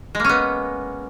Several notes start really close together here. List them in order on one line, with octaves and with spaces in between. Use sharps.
G#3 A#3 C#4 B3